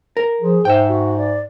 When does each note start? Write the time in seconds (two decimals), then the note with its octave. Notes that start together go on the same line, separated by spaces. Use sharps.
0.17 A#4
0.41 F3 G#4
0.65 G#2 C5 E5 G5
0.89 F#4
1.18 D5